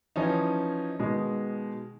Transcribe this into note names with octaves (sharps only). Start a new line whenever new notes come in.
E3 F3 C#4 D#4
B2 D#3 G#3